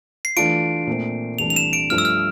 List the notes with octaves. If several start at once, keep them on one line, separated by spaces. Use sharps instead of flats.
C7
E3 A3 D4 F4 D7
A#2 A3 C4
C2 C3 E3 A3 D4 F7
F7
E7
D7
G2 F3 A3 F6
E6
F6